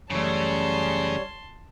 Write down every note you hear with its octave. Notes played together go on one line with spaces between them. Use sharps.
F#2 C#3 E3 G3 A3 C#5 A5 C6